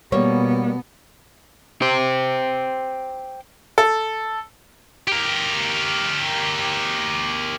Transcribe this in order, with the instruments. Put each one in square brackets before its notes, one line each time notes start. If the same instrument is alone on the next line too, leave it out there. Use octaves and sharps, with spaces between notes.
[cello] B2 B3 [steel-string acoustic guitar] G3 A#3 [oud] C#5
[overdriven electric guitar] G4 C5
[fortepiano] A4
[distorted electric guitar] G4 A#4